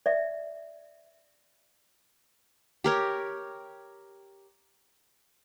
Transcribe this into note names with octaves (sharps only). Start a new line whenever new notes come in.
D5 E5
G4 A#4 C#5